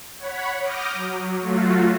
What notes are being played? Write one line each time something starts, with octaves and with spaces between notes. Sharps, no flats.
C#5 F#5 B5
D6 D#6 F6 G6 A#6
F#3
F#3 A3 F4 F#4